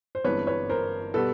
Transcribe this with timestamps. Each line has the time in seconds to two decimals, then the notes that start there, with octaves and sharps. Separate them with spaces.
0.15 C5
0.24 G1 G2 E3 G#3 C4 B4 C#5
0.47 B4 C#5
0.69 A#4 C5
1.14 B2 G3 B3 A4 B4